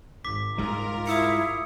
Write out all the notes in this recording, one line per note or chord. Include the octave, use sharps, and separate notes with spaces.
G#1 D6 B6
G#2 G3 F4 A#4
E4 D#6 E6 C#7